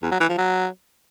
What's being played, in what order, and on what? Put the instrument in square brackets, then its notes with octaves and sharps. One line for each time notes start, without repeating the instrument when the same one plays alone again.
[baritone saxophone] E2
F#3
E3
F3
F#3